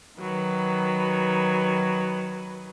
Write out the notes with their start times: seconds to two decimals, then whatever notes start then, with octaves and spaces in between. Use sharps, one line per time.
0.19 D#3 F#3 B4